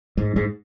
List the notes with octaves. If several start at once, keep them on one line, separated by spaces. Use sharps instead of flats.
G#2
G#2